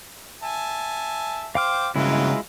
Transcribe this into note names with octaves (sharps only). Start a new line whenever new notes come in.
E5 G#5 A5
C5 F5 G5 D6 F6
G2 C#3 E3 F#3 G#3 E4 F4